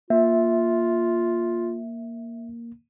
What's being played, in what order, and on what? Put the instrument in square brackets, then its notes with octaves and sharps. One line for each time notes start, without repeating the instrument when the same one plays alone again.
[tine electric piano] A#3 [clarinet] F4 [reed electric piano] E5